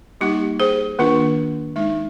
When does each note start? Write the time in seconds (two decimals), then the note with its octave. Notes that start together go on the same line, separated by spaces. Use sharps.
0.21 G3 A#3 D#4 G4
0.60 G#4 C5
0.99 D#3 A#3 D4 F4
1.76 G#3 D#4